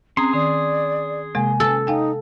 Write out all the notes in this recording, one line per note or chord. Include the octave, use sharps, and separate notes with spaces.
C4 C#4 G#4 A#5 C6 D#6
D#3 D5
C3 G#3 A#3 G#5
A4
D#4 F5 G5 G#5